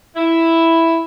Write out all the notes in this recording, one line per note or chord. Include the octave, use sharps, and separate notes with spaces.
E4